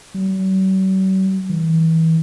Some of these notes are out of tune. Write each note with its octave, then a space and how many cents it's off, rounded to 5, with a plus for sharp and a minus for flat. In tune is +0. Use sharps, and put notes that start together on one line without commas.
F#3 +45
E3 -30